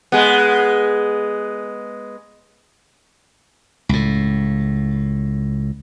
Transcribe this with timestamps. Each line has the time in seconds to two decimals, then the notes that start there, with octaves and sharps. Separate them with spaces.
0.12 G#3 B3
3.89 C#2 A2